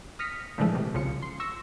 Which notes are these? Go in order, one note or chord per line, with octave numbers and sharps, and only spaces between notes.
D#6 F6 A#6 B6 C#7
A#2 D3 E3 F3 G#3 A3
C3
C2 C#3 F4 C#7
C6
C#6 E6 A#6